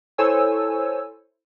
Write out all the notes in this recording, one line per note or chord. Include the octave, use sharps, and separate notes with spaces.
E4 A4 C5 C#5 G#5 E6